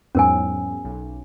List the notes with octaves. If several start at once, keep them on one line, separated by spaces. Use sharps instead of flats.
E2 G#2 F#3 C#4 A#4 G#5
B1